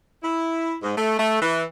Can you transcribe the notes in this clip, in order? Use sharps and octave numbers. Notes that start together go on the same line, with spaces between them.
E4
G#2
A3
A3
E3